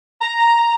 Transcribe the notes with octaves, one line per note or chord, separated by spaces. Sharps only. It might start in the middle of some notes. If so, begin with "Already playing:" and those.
A#5